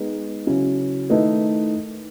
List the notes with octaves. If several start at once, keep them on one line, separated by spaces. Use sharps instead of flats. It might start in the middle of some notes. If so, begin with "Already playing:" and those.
Already playing: G#3 B3 D#4 G#4
C#3 F#3 C#4 E4
D#3 A3 E4 B4 D#5